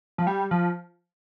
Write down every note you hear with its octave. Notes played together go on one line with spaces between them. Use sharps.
F3
G3
F3